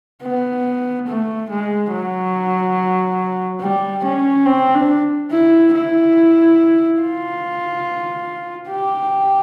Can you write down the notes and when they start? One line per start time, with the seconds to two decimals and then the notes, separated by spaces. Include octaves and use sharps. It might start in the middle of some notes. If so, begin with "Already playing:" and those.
0.23 B3
1.08 A3
1.50 G#3
1.92 F#3
3.61 G3
4.05 C#4
4.46 C4
4.75 D4
5.31 E4
5.74 E4
7.02 F4
8.70 G4